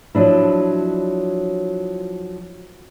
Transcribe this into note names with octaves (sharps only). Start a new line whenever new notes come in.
F3 F#3 D4 E4